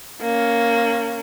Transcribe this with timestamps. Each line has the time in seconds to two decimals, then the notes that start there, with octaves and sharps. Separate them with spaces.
0.22 A#3 C#4